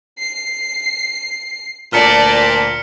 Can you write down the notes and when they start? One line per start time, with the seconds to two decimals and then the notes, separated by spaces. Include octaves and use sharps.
0.18 C7
1.93 D2 A#2 D5 A5 F6 B6 C#7